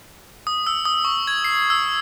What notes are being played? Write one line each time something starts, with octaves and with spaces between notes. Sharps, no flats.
D#6
E6
D#6
C#6
G#6
C7
E6